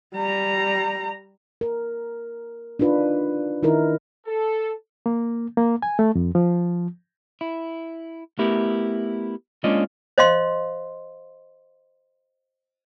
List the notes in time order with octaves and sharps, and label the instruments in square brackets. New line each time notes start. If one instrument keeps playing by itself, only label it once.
[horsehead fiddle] G3 A#5
[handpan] A#4
D4 D#4 F4 B4
D#3 D#4 E4 A#4
[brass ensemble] A4
[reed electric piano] A#3
A#3
G#5
A3
F2
F3
[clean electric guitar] E4
A3 B3 E4 G4 A#4
G#3 A#3 C#4 D4 F4 D#5
[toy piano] C5 D#5 F5 C6